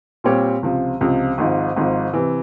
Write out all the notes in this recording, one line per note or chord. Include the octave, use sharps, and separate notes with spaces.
A#2 G3 C4 G4 C#5
C#2 C3 F3
C#2 C3 F3
G#1 G#2 F3
G#1 G#2 F3
C3 E3